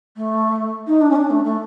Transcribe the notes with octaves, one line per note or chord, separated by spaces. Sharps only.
A3
D#4
D4
C#4
D4
A3
A3